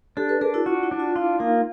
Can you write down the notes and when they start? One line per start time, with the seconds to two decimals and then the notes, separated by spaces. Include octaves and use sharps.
0.17 D4 G4 A4
0.29 A4 B4
0.41 D4 G#4 A#4
0.54 E4 F#4
0.66 F4 F#4
0.83 E4
0.91 D4
1.00 F4
1.16 E4 F4
1.40 A#3 D#4